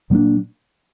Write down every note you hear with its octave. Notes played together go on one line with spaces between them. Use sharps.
A#2 F#3 A#3 D4